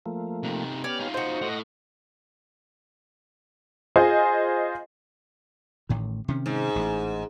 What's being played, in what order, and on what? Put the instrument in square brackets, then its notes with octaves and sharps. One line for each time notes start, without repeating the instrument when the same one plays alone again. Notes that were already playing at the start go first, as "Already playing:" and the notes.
[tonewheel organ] F3 A3 A#3
[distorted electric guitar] C3 D#4
[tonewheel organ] B3 G4 F6 [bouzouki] C#4 [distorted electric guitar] D5
[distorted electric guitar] D#4 F4
[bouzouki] F#4 C5 [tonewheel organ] D#5
[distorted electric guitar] A2 [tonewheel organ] D#5 F#5 A#6
[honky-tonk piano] F4 G#4 C5 D#5
[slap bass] A1 A2 D#3
C3 D#3 C#4
[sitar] G#2
[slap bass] A1